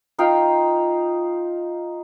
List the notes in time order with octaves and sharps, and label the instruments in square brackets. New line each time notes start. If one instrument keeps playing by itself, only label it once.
[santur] D#4 F4 F5 G5